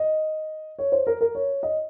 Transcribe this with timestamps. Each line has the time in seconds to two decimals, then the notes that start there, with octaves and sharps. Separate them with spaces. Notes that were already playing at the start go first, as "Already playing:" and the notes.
Already playing: D#5
0.79 C#5
0.92 C5
1.07 A#4
1.21 A#4
1.35 C#5
1.63 D#5